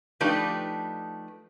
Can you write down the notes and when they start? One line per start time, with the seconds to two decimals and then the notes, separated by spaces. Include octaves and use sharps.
0.21 F3 A3 D4 D#4 G4 B4